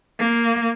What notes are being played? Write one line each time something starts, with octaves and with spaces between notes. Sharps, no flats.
A#3